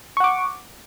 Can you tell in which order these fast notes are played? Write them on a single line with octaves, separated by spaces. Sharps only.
C#6 F#5 D6